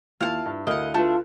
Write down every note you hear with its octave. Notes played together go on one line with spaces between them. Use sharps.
D#2 E4 F4 F5 F#5 A5
G2
D2 E4 A#4 D#5 F5 F#5
A3 D4 F4 B4 A5